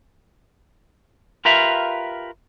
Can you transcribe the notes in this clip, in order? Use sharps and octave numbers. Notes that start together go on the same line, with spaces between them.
F4 G4 A#4 B4 E5 F5